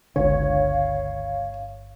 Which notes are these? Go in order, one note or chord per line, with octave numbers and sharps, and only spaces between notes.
G1 C#2 D3 C#5 F5